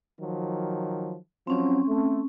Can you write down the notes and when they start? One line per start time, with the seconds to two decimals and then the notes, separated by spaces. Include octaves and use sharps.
0.20 D#3 F3 F#3
1.47 F3 F#3 C4 C#4
1.87 A3